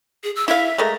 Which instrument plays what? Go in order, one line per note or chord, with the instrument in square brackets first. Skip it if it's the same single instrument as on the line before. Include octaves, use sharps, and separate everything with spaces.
[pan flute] G#4
E6
[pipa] E4 F5 [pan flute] E5
[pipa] G#3 A3 A#4